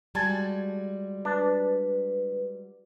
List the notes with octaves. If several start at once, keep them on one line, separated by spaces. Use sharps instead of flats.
G3 G#3 F#4 G#5 A5
D4 B4